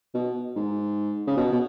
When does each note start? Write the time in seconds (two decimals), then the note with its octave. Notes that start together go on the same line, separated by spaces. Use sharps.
0.14 B2
0.56 G#2
1.27 C#3
1.37 B2
1.52 B2